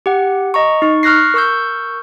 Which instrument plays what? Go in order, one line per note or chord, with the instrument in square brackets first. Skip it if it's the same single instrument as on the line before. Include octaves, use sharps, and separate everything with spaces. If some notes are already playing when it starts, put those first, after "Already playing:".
[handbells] G4 F#5
D#5 A#5 C#6
D#4 C#6
C#6 F6 F#6 A#6 C7
A#4 C#6 E6 G6